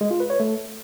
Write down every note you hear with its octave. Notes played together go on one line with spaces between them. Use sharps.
G#3
F4
B4
C#5
A3